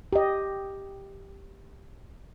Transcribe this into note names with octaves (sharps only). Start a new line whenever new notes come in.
G4 D#5